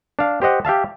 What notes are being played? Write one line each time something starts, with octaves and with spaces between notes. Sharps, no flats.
D4 F5
G4 C5 D#5 F#5
G4 E5 F5 A5